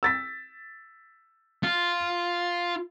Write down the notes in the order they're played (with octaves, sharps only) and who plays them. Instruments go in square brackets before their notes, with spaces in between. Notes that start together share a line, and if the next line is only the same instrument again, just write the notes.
[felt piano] E6 A6 B6
[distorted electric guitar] F4